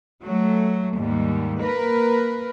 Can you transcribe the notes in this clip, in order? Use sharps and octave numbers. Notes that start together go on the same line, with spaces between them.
F#3 A3
D#2 G#2 G3
A#3 A#4 B4